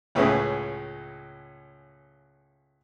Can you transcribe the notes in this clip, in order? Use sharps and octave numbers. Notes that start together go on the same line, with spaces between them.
C#2 A2 C#3 B4